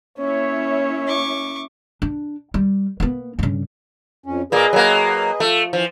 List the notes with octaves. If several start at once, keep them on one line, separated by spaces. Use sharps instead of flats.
A#3 C#4 E4 C#5 E5
C#6 D6
D4
G3
A#3 B3
G2 C#3
F2 C#4
A#2 A#3 G#4 B4 D#5
F#3 A#3
F3 A3
E3 F3